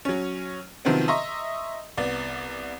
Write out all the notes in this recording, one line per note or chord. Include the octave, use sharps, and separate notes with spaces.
F#3 C#4
C3 D#3 F3 F#3 B3 C4
D#5 E5 A#5 C6 C#6 D#6
C2 B3 D5